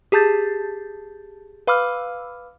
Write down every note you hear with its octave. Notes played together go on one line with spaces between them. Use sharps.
G4 G#4 A5 G6 A6
B4 F5 B5 D6 E6 F6